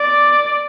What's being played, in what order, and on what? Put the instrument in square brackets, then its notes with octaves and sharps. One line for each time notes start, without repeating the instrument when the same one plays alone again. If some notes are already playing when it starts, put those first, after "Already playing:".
Already playing: [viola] D5